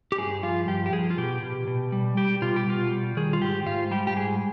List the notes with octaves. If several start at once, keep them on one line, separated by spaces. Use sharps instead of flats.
G4
G2 G#4
F3 F4
G2 G4
G4
F3 G#4
F4
B2 G4
B2
B2
G3
G3 G4
B2 F4
G4
B2 F4
G3
D#3 G#4
F4
G#2 G4
G#2 F4
G3 G4
G4
G#2 G#4